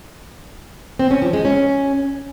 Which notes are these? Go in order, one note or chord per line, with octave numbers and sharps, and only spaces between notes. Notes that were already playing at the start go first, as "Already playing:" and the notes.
C4
C#4
F3
G#3
C#4